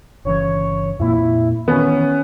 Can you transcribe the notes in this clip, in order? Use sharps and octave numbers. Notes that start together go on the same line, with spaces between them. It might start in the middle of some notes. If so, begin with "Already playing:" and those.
G1 C#3 E3 C#5
F2 A#2 A#3 E4
D#3 E3 B3 C#4